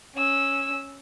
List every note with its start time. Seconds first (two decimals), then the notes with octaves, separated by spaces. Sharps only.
0.15 C#4 E6